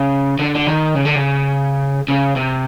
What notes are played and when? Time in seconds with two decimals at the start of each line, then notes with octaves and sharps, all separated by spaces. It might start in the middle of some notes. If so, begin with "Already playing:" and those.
Already playing: C#3
0.39 D3
0.55 D3
0.67 D#3
0.95 C#3
1.05 D3
1.16 C#3
2.08 C#3
2.36 C3